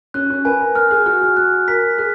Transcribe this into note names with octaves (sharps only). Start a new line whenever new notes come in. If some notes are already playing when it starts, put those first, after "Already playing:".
C#4 F#6
C#4
B4 G#5
A#4
A#4 F6
G#4
F#4 F6
F#4
F#4 F#6
A#4 B6
G#4 F#6